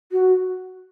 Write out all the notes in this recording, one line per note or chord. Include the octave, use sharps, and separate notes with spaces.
F#4